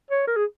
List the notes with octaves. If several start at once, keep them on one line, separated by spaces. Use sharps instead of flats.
C#5
A#4
G#4